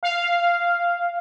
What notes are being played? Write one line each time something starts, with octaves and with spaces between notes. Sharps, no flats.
F5